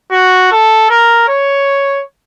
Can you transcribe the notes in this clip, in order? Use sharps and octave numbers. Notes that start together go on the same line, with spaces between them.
F#4
A4
A#4
C#5